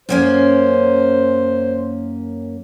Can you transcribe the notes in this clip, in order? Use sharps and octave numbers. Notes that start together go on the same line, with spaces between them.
F#2 A#3 C#4 C5